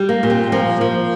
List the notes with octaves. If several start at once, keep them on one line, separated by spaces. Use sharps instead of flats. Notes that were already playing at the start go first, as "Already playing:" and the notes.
Already playing: G3
A#3
A#2
C4
F3 A#3
F3